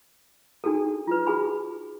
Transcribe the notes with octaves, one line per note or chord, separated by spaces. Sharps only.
D4 D#4 F#4 G#4 A4
F4 B4
F#4 G#4 G#5 B5